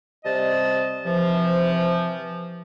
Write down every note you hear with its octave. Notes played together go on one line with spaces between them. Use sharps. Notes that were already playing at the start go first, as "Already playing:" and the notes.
C3 G3 D#5 A5
C3 E3 F3